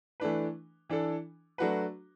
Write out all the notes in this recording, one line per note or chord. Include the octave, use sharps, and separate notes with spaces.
E3 A3 D4 B4
E3 D4 A4
F#3 A3 D4 F#4 B4